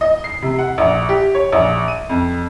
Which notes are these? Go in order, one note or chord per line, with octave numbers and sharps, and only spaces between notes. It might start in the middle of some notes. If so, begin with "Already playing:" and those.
D#5
C7
C3
F#5
A#1
G4
C#5
A#1
D#7
F2